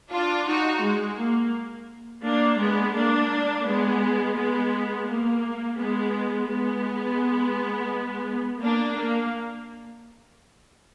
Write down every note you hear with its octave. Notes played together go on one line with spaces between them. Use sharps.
D4 F4
D#4 F#4
G#3
A#3
A#3 D4
G#3 B3
A#3 D4
G#3 B3
G#3 B3
A#3
G#3 B3
G#3 B3
A#3 D4
A#3